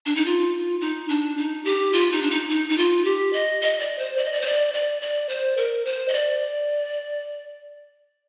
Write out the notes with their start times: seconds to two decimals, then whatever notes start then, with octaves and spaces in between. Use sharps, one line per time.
0.06 D4
0.15 D#4
0.26 F4
0.81 D#4
1.09 D4
1.38 D#4
1.65 G4
1.93 F4
2.13 D#4
2.22 D4
2.30 D#4
2.49 D#4
2.69 D#4
2.78 F4
3.05 G4
3.33 D#5
3.61 D#5
3.80 D5
3.99 C5
4.18 D5
4.25 D#5
4.33 D5
4.42 C5
4.46 D5
4.74 D5
5.02 D5
5.29 C5
5.57 A#4
5.85 C5
6.08 D#5
6.13 D5